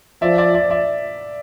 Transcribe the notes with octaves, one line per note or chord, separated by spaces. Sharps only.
F3 D5 E5
D5 E5
D5 E5
D5 E5